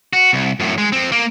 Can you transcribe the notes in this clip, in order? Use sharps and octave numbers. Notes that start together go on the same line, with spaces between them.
F#4
C2
F#2 A2
G#3
F3 C4
A#3